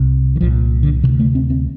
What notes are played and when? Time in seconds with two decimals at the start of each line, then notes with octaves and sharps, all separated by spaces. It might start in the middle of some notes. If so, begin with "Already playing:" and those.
Already playing: C2 C3
0.36 D#3
0.41 C2 A#2 F3
0.83 D3
1.03 C3 D#3
1.07 D2
1.20 A3
1.35 C4
1.50 C4